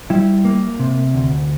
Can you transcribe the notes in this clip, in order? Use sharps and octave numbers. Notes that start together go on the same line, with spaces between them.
G3 E4
A#3
C3
D2